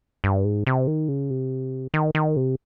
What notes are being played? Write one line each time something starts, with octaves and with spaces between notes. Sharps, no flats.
G2
G#2
C3
D#3
C#3
C3
D#3
D#3
C3